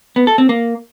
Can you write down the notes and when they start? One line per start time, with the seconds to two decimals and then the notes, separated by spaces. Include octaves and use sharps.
0.16 B3
0.27 A4
0.38 C4
0.49 A#3